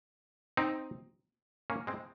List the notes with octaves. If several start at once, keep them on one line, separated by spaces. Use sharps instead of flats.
C4 D#4
A#3 C#4
G#3 C4